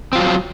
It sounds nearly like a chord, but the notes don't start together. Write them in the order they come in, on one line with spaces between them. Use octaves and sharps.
C4 F4 F#3